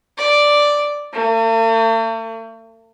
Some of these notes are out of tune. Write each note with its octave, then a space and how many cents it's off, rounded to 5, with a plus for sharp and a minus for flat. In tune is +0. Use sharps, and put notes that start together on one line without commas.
D5 +0
A3 +45